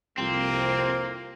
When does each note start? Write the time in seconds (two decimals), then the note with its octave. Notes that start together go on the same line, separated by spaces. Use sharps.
0.18 C2 F2 C3 F3 A#3 C4